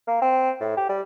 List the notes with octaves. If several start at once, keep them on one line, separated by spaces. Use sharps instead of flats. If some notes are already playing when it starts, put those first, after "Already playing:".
A#3
C4
A2
G4
G3